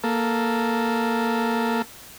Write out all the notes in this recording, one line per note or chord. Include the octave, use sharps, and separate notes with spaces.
A#3 A4